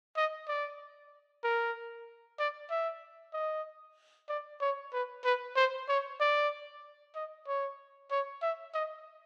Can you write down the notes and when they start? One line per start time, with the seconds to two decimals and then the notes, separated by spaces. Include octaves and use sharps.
0.16 D#5
0.48 D5
1.44 A#4
2.39 D5
2.70 E5
3.33 D#5
4.29 D5
4.61 C#5
4.93 B4
5.24 B4
5.56 C5
5.88 C#5
6.20 D5
7.15 D#5
7.47 C#5
8.11 C#5
8.42 E5
8.74 D#5